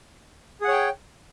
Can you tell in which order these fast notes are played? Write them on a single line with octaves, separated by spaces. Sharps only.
G#4 F#5 C#5 G5